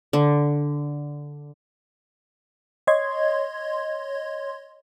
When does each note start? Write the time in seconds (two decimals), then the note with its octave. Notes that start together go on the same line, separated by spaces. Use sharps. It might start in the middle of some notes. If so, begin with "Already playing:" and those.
0.13 D3
2.87 C#5 D#5 C6 G#6